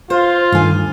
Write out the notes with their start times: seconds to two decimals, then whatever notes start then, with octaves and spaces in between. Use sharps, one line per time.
0.10 F4 C5
0.52 D2 G2 D#3 G#5